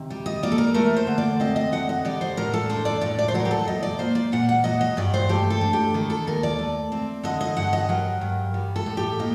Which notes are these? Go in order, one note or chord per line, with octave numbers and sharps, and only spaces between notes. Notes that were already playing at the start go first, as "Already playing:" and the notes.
Already playing: C3 D#3
G3
D#5
A#3 D5
A4
A#4
A3 A#4
C5
D3
D5
C4 D#5
D#5
D3 F#5
D#5
G3 D5
C5
A2 A#4
A4
D4 C5
D5
A2 D5
D5
C5
F#3 A#4
G4
A4
A#2 D#5
D5
A#3 C5
D5
A#2 F#5
F#5
F#3 D#5
D#5
G2 D5
C5
A3 G4
A4
D4
G4
D#3 A4
A4
D#2 A#4
D5
A3
C4
D3 D#5
D#5
G2 F#5
D#5
F#3 A#4
G2
G3
A4
A2
G4
A#3 D#5